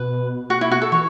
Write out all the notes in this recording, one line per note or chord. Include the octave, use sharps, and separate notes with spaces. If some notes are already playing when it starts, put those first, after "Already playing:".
Already playing: B2 B4
F#4
E4
F#4
A4
E3 C#5